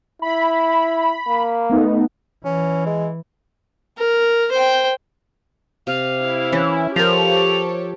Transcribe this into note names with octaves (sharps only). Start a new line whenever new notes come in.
E4 B5
A#3
A3 B3 D#4
E3 C#4
G#3
A#4
C5 G5
C3 F5
E4
E3 C#4
F3 G4 A4 A#4 C5 C#5 F7